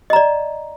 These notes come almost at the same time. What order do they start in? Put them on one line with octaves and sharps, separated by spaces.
D#5 A#5 D5